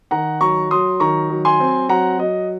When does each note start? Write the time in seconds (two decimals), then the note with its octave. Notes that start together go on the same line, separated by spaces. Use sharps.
0.11 D#3 F#5 A#5
0.41 F#3 A#5 C#6
0.71 F#3 C6 D#6
1.00 D#3 A#5 C#6
1.30 F#3
1.45 G#5 C6
1.60 C4
1.89 F#3 F#5 A#5
2.18 F#3 D#5